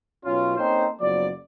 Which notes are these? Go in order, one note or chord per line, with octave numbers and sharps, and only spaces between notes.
B1 C#4 F4
A#3 C4 C#4 D#4 A4 C5
F#1 F3 F#3 B3 D5